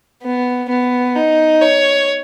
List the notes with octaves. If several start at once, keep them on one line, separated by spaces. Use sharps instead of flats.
B3
B3
D#4
C#5